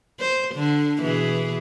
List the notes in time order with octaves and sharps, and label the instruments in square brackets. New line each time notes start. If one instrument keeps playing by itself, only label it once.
[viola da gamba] C5
D3
B2 E3 G#4